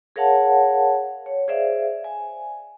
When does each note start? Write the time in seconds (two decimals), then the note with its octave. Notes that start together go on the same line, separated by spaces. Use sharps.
0.16 G#4 A#4 C#5 F5 F#5 A5
1.26 C#5
1.48 G#4 C5 D5 E5 F5
2.04 G#5